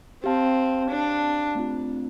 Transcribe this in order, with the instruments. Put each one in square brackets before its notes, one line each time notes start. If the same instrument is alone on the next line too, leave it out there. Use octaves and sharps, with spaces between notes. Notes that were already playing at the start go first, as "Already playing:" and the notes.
[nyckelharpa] C4 [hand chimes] G4 F5 A5
[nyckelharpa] D4
[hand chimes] A3 C4 F4